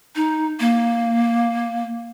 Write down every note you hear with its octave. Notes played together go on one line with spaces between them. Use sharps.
D#4
A#3